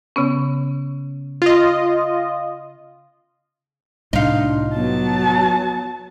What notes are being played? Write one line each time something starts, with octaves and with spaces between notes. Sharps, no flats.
C#3 B3 C#4
F4 D#5
C2 A2 D4 D#4 F4
F#3 B3 A5